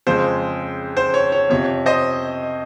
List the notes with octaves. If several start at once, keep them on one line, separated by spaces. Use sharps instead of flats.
F2 C#3 G#3 C5
C5
C#5
C#5
F2 C3 F3 C#5
C5 D#5